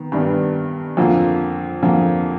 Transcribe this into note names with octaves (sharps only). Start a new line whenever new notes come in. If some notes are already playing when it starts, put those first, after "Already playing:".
Already playing: D#3 B3
G2 D#3 G3 B3 D4
F2 D3 F3 A#3
F2 D3 F3 A#3